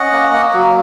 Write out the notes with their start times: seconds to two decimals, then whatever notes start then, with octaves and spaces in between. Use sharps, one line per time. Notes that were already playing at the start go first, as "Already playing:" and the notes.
Already playing: C#4 D#5 F#5
0.12 A#3
0.33 A#3
0.53 F#3